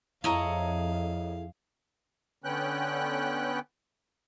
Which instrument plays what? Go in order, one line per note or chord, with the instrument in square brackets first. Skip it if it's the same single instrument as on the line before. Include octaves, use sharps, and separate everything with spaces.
[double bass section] F2 [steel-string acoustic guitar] E4 G#4 A4 [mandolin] C#5 D#5 A#5 [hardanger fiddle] F5
[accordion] D3 B3 C#4 G5 F#6